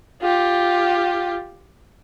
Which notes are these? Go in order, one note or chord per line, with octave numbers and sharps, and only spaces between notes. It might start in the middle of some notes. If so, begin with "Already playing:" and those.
F4 G4